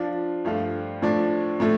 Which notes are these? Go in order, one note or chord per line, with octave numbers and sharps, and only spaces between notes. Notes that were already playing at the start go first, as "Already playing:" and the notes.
Already playing: F3 D4 F4
G2 F3 A3 F4
A2 F3 D4
A2 F3 A3